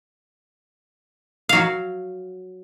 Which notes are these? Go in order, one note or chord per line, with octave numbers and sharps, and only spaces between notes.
F#3 F5